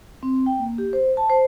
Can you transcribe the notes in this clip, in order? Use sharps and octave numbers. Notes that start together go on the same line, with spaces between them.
C4
G5
A#3
G4
C5
A5
C5